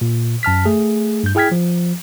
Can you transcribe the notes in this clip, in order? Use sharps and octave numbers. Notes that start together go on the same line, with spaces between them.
A#2
F#2 A5 F6 B6
A3 G#4
G2 G6
E4 G#4 G5 F6 G#6 B6
F3